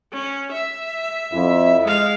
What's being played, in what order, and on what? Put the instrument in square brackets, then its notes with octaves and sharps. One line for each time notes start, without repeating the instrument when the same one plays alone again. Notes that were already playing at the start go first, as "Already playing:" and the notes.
[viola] C#4
E5
[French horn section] F2 E4
[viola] G#3 F5 [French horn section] D#5